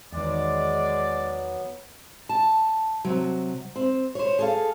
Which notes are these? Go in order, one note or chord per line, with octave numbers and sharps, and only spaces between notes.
E2 D#3 F#3 G#3 B3 D5
A5
C3 F#3
C4
C5 C#5
G#4 A4 F5